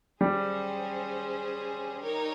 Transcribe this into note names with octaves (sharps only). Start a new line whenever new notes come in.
G3 C#4 G#4 C5
D#4 A#4 C#5